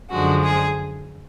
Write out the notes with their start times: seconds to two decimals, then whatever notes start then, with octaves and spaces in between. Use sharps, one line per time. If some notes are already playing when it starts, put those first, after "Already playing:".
0.10 F#2 D3 F3 G#3 F#4
0.42 G#4